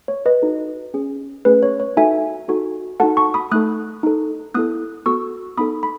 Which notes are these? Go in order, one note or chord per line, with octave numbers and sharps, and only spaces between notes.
C#5
B4 D#5
D#4 F#4 A4
C#4 G#4
A3 C#4 G#4 B4
C#5
C#5
D#4 F#4 A4 E5 G#5
D#4 F#4 A4
D#4 F#4 A4 F#5 A5
A5 C#6
B5 D#6
A3 D#4 A4 D#6 F#6
D#4 A4
B3 E4 A4 D#6 F#6
B3 F#4 A4 C#6 E6
B3 D#4 A4 B5 D#6
B5